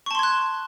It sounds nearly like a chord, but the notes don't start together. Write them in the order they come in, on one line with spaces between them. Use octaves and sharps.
C#6 A5 C6 G#6 F#6